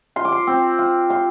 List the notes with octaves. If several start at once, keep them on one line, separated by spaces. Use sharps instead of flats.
F4 C6
D6
C6
C4
F4
F4 C6